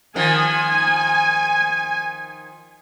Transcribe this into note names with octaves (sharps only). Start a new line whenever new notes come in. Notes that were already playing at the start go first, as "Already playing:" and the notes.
D#3 F3 G#5